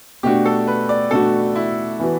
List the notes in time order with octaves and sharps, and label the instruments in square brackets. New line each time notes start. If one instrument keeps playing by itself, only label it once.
[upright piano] B2 A3 D4 F#4 [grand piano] G4
[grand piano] A4
B4
D5
[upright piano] B2 A3 D4 F#4 [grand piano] A4
[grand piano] E4
[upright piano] E3 B3 F#4 B4